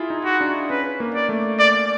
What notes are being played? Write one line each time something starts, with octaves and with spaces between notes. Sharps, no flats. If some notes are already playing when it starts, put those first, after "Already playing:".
Already playing: E4 F4 G#4
D#4
F#4
D4
C#4 B4
A#3
D5
A3
D5